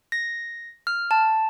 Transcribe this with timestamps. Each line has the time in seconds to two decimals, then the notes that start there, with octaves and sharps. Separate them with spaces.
0.12 A#6
0.87 F6
1.11 A5